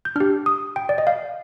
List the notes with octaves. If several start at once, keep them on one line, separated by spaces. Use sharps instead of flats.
G6
D4 G4 F6
D#6
G5
D5
D#5
F5